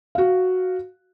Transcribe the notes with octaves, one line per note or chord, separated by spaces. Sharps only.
F#4 F5